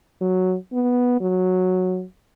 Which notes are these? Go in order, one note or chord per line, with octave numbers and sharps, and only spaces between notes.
F#3
B3
F#3